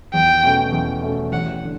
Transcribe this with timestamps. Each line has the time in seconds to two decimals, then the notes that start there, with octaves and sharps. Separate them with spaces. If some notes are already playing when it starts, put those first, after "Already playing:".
0.14 E2 G5
0.44 B2 A3 C#4
0.72 E2
1.02 B2 A3 C#4
1.32 A1 F#5
1.63 D3